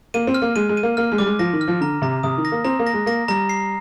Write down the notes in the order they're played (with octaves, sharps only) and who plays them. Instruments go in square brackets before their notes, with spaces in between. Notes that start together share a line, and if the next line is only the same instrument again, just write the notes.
[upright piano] A#3 [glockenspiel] D#7
[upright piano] C4
[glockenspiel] F6
[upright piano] A#3
[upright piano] G#3 [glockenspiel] D#7
[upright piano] G#3
[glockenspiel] D#7
[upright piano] A#3
[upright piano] A#3 [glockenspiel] F6
[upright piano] G#3
[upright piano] G3 [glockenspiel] D6
[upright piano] G#3
[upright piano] F3 [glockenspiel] A#6
[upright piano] D#3
[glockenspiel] F6
[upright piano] F3
[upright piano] D3 [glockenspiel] A#5
[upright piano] C3 [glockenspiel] A#5
[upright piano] C3 [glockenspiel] D#6
[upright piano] D#3
[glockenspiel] A#6
[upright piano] A#3
[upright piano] C4 [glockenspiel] A#5
[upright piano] A#3
[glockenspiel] A#6
[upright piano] G#3
[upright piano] A#3 [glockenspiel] A#6
[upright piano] G3 [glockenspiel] A#5
[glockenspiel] C7